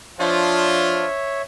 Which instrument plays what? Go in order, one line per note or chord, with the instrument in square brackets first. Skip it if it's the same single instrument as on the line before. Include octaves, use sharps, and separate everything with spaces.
[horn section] F3 D4 F4 [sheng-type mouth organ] C#5 E5